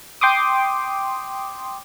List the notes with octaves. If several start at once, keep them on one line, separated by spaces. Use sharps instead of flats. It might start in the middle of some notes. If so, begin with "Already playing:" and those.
G5 C6 D6 D#6